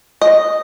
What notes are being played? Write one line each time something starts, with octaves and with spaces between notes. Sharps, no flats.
D#5